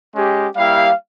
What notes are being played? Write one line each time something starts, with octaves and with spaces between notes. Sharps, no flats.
G#3 C#4 G4
G3 A#3 E4 G4 F5